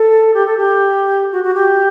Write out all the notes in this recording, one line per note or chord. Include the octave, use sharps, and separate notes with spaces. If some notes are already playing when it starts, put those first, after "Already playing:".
Already playing: A4
G4
A4
G4
F#4
F#4
G4